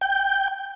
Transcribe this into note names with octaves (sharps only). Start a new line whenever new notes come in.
G5